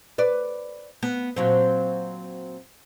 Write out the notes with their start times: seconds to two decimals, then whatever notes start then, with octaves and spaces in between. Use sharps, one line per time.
0.18 B4 D5
1.03 B3
1.36 A#2 F#3 C4